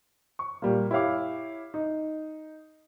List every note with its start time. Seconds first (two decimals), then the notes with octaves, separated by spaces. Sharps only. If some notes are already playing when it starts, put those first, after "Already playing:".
0.39 C#6
0.62 A#2 G3 A#3
0.91 E4 G4 C#5 F5 D6
1.74 D#4